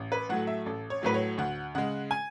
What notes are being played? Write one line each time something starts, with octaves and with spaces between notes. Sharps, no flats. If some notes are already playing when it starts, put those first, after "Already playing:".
Already playing: A1
B4
A2 F#3 A3 F#5
E5
A1 A4
C#5
A2 F#3 A3 B4
C#5
D2 F#5
C#3 G#3 F#5
G#5